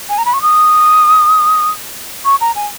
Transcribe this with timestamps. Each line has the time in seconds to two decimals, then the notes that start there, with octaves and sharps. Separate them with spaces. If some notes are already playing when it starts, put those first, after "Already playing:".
0.09 G#5
0.18 A#5
0.26 B5
0.33 C#6
0.42 D#6
2.25 C#6
2.41 A#5
2.56 G#5